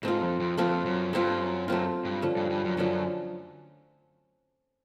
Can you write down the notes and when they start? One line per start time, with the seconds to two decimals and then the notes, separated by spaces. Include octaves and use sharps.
0.03 G#2 A3 C4 F4
0.22 F2
0.40 F2
0.57 F2 A3 C4 F4
0.85 F#2
1.13 G2 A3 C4 F4
1.40 F#2
1.68 F#2 A3 C4 F4
2.05 G2
2.22 D3 F3 A3 C#4
2.37 G2
2.50 G2
2.64 F#2
2.77 F#2 D3 F3 A3 C#4